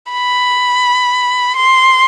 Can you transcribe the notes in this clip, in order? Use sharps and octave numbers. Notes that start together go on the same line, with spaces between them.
B5
C6